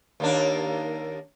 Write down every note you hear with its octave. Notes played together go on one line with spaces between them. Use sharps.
D#2 A#3 D4